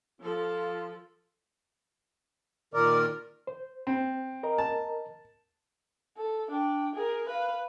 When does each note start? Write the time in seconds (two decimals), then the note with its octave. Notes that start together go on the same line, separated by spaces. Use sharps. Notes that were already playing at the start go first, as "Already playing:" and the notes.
0.21 F3 F4 A4
2.74 A#2 D#3 A#4 D5
3.47 C5
3.87 C4
4.43 A#4 D#5 A#5
4.58 A5
6.17 A4
6.50 D4 G5
6.95 G#4 A#4
7.28 B4 F5